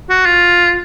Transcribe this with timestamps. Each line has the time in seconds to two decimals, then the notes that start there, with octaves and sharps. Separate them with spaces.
0.09 F#4
0.26 F4